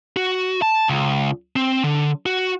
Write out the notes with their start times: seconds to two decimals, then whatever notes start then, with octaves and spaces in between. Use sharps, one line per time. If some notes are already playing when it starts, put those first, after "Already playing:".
0.16 F#4
0.62 A5
0.88 C#2
1.56 C4
1.84 D3
2.26 F#4